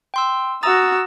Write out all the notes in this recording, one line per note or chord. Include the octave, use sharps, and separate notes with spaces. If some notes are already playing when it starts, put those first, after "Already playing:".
G5 C6 E6
F#4 A#5 D#6 E6 A6